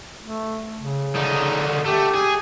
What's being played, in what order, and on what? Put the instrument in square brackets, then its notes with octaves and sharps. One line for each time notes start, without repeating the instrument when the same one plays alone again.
[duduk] A3
C#3
[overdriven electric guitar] D3 D#4
[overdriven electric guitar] A3 [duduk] G4
[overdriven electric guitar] G#4